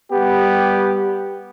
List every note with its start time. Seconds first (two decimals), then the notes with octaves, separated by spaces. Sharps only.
0.11 G3 B3 G4